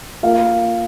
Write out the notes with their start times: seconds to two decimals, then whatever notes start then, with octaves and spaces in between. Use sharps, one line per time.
0.23 A#3 F4 F5